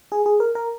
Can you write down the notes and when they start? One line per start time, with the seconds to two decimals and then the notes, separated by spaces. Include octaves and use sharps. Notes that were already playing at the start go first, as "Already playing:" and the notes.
0.12 G#4
0.26 G#4
0.40 A#4
0.55 A#4